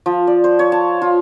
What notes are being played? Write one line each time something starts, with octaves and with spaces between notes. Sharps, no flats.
F3
D5
C5
C#5
A5
F4